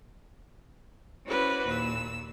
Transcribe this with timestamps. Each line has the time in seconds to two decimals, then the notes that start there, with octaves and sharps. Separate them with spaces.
1.27 C#4 E4 F#4 B4 C5 D5
1.66 D#2 A#2 E6